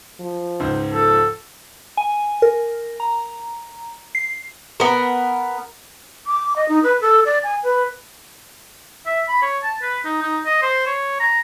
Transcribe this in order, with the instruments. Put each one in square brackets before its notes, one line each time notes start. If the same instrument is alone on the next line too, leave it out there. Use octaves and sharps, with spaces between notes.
[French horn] F3
[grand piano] C#2 G#2 C5
[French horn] F3 [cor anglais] A4
[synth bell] G#5
A#4
A#5
C7
[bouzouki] B3 A#4
[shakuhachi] D6
D#5
D#4
B4
A4
D5
G#5
B4
[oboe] E5
B5
C#5
A5
B4
D#4
D#4
D#5
C5
C#5
A#5